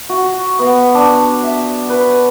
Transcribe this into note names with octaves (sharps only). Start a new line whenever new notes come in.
F#4
B3
D4
E5
B4